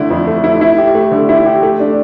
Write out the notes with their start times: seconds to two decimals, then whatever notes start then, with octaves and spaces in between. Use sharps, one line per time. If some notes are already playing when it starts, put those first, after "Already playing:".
Already playing: D3 A3 E4
0.10 F2
0.27 A3
0.44 E4
0.61 E4
0.78 G4
0.95 A3
1.11 D3
1.29 E4
1.46 G4
1.63 A3
1.80 D4